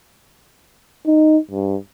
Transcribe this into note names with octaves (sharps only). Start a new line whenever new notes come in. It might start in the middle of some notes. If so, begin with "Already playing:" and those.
D#4
G2